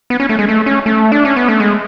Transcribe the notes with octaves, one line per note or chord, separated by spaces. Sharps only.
B3
C#4
A3
G#3
A3
C#4
A3
D4
C#4
B3
A3
G#3